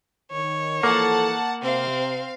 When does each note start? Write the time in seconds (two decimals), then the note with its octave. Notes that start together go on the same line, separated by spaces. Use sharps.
0.32 D#3 C#5
0.83 E3 F3 A#3 A4 F#5 A5
1.63 C3 C4 F5